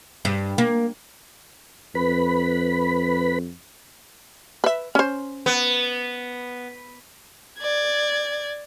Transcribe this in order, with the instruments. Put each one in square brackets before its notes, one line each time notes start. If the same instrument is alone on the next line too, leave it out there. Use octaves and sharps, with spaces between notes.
[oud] G2
A#3
[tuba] F2 [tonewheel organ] B4 B5
[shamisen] B4 E5
C#4 C5
[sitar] B3
[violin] D5 G#6